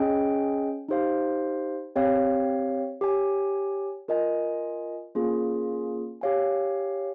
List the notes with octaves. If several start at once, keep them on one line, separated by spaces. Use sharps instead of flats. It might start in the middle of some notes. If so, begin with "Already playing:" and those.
Already playing: C#4 G#4 D#5 G5
D#4 G4 C5 F5
C4 G4 C#5 F5
G4 C#5 G#5
F4 A#4 D#5 G#5
A#3 C#4 F4 G#4
G4 C#5 F5 G#5